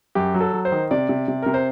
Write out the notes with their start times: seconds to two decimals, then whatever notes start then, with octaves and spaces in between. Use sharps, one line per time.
0.15 F#2 G4
0.34 F#3
0.41 A4
0.53 F#3
0.65 C5
0.72 D#3
0.91 C3 D5
1.09 C3
1.28 C3
1.42 C3 A#4
1.54 C5